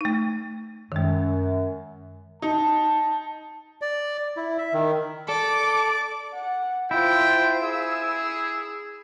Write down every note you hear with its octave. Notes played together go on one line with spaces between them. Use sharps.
A3 D#4
F#2 D#3 G#3
D#4 A5
D5
E4
E5
D#3
A4 D5 D6
F#5
E4 F4 C5 G5
G#4 E6